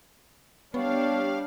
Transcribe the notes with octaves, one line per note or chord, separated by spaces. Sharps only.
G3 B3 D4 G4 C#5 F5